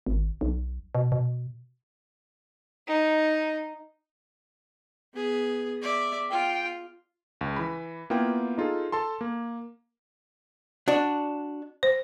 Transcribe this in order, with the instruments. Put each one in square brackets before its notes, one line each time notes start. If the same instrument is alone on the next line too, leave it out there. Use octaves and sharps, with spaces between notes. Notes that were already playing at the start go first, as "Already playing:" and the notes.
[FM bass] G#1
B1
B2
B2
[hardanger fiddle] D#4
[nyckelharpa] B3 G#4
D5 E5
[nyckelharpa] F4 [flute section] G5
[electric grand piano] C#2
E3 B5
A#3 B3 E4 F4 G5
D#4 F4 G#4 A4
A4 A5 C6
A#3
[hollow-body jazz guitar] D4 F#4 D5
[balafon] C5